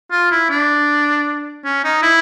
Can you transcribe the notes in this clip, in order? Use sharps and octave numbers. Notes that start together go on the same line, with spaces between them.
F4
E4
D4
C#4
D#4
E4